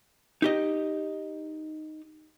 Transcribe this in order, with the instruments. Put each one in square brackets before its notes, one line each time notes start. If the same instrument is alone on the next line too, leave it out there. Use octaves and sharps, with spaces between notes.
[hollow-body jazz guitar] D#4 G4 D#5